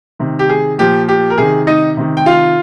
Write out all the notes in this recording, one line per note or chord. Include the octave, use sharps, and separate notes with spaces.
C3 D#3
G4
G#4
A#2 F3 G4
G4
A#4
C3 D#3 G#4
D#4 D#5
C3 D#3
G5
F4 F5